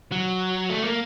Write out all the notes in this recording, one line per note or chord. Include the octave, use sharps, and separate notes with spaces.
F#3
A3
A#3